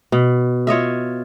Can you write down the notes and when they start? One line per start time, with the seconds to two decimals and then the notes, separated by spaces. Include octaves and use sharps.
0.12 B2
0.67 F4 C#5 D#5 E5